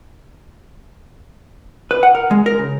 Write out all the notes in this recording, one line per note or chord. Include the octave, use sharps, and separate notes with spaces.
B4
F#5
A#4
G#3
A#4
C#3